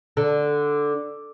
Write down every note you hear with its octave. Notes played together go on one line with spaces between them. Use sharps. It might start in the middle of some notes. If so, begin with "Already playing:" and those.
D3